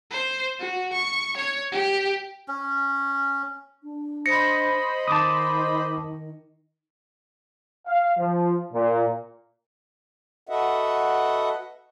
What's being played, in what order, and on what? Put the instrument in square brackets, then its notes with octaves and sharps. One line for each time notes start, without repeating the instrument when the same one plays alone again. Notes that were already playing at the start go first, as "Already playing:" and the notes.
[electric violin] C5
F#4
C#6
C#5
G4
[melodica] C#4
[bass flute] D4
[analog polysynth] C5 D#5 B5 [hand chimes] A#6 C#7
[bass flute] D#3 [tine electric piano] A5 D6 D#6
[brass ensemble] F5
F3
A#2
[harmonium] F#4 A4 B4 D#5 E5 F#5